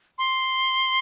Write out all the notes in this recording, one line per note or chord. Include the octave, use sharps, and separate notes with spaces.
C6